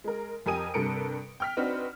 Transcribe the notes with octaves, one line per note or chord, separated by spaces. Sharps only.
G#3 A#4
F2 G4 A#4 G#5 D#6 D#7
G2 C3 A4 A#4 C#7 D7
G5 F6 B6
C4 D4 D#4 F#4 B4